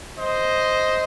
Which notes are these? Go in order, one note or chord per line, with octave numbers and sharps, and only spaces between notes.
C5 D#5